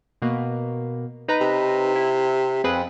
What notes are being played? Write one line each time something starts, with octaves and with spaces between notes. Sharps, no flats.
B2 A#3
D#4 B4 A#5
C3
E4
F2 C4 G#4 B4